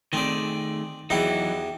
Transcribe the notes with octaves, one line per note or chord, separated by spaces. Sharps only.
D#3 A3 C4 G#4 D5
E2 E3 F#3 D#4 E4 G4